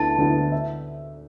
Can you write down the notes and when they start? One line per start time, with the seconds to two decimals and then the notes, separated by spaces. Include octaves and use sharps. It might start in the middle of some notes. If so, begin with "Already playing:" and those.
Already playing: D2 D3 B3 E4 A4 A5
0.18 D2 D3 B3 E4 A4
0.52 E5